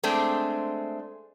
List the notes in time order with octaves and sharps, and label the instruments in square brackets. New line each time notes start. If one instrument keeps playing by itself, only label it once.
[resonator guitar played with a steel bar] G#3 A3 C4 D4